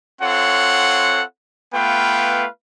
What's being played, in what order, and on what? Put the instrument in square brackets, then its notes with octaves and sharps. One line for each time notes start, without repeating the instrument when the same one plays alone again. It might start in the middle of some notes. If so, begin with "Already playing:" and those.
[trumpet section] C4 F4 A4 C#5 F#5
A3 B3 F4 B4 F5 G5